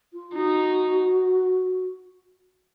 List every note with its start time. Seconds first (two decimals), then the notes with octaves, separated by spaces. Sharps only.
0.14 F4
0.35 D#4 F#4